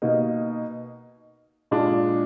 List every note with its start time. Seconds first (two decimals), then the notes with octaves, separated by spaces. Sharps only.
0.02 B2 A#3 D#4
1.71 A#2 G#3 D4